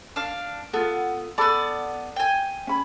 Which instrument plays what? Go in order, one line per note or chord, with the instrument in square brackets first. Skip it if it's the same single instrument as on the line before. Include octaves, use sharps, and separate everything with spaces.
[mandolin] D4 F5
[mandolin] B3 [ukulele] F4 A4
[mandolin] B3 D5 [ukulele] A4 A5 B5
[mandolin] G5 G#5
[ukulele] C#4 B5